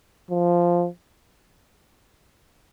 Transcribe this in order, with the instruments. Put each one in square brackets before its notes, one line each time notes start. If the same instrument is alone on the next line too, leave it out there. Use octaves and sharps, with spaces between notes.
[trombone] F3